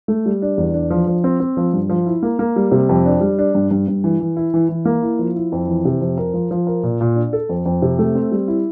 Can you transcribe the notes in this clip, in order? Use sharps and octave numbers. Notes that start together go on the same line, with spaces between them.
A3
G3
D4
E2
D4
F3
F3
C4
C4
F3
G2
F3
E4
A#3
A#3
G3
C3
F2
D4
G3
D4
G2
G2
G2
E3
E3
E4
E3
E3
A#3
E4
F3
E4
F2
E3
C3
F2
A#4
F3
F3
A#4
A#2
A#2
D4
A4
F2
F2
C3
A3
C4
G3
E4